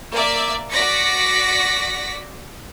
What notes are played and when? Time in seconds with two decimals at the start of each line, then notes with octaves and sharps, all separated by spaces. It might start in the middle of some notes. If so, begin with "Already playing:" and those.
0.12 A#3 D5 E5
0.70 F#4 D5 A#6 B6 C#7